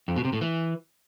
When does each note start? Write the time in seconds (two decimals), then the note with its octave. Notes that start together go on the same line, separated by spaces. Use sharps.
0.08 F2
0.16 B2
0.25 C3
0.33 A2
0.41 E3